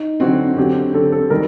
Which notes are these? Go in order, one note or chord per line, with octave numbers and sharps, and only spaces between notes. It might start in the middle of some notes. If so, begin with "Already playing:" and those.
Already playing: D#4
D3 F#3 C4 F#4
D3 F#3 C4 G4
D3 F#3 C4 A4
A4
D#3 G3 A#4